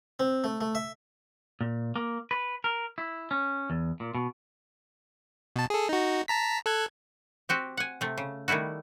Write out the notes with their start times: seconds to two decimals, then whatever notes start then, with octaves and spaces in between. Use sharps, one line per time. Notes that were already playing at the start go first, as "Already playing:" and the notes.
0.20 C4
0.44 A3
0.61 A3
0.75 E5
1.61 A#2
1.96 A#3
2.31 B4
2.64 A#4
2.98 E4
3.31 C#4
3.70 E2
4.00 A#2
4.15 B2
5.56 B2 A5
5.70 G#4 A4
5.89 D#4 F#4
6.28 A5 A#5 B6
6.66 A4 F#6 G#6
7.49 C4 F#4 G4
7.77 F#5 G#5
8.01 C3 A3
8.17 C#3
8.48 D#3 G3 A3 E4 F#4